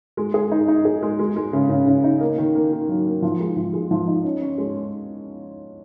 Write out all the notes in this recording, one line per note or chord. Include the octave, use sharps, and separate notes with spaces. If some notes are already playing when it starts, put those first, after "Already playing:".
G#3
G#4
D#4
D#4
G#4
G#3
G#3
G#3
C#3
C#3
C#3
D#4
A#3
D#3
A#3
D#3
F#3
A#3
F3
G#3
F3
G#3
F3
D#4
C#4
C#4
G#3